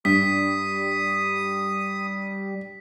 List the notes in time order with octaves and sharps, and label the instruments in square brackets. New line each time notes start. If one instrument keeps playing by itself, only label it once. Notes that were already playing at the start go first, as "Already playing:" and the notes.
[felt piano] G2 [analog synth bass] G3 [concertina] D#6 [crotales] B6